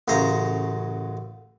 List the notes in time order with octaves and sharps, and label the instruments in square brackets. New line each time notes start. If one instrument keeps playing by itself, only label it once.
[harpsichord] A1 F#2 C#3 C5 A#5